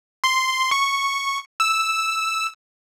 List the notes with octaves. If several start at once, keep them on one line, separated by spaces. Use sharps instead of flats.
C6
C#6
E6